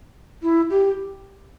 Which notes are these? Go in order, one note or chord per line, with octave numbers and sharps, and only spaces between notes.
E4
G4